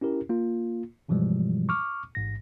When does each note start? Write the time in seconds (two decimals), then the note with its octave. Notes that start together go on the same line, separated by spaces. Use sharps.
0.01 C#4 E4 G4 A#4
0.29 A#3 F4
1.09 G2 B2 E3 F3 G3 G#3
1.69 C#6 D6 F6
2.15 A1 G#2 A#6